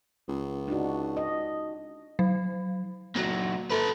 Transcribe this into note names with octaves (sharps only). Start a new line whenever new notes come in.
C#2
D4 D#4 F#4
D#5
F#3
A#2 F#3
A4 B4